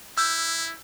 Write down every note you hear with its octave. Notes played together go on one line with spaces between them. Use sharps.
E4 E6 G6